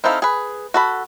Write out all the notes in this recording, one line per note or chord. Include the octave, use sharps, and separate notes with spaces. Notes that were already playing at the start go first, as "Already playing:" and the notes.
C4 D#4 E4 A4 F5
G#4 B4
F#4 A4 B5